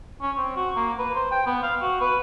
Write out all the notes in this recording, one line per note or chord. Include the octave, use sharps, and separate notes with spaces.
C#4
C4
F#4
A#3
B4
C5
G5
B3
F5
F#4
B4